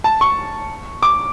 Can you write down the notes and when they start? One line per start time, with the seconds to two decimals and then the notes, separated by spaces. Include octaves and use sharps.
0.04 A5
0.21 C#6
1.02 D6